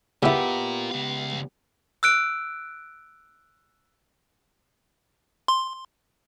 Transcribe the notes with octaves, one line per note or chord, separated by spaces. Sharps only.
C#3 B3 E4 F4 G4 A#4 E5
C#2 F5
E6 F#6 D7
C6